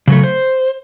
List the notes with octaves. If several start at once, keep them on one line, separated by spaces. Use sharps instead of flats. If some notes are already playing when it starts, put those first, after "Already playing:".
C#3 F#3 A3
C5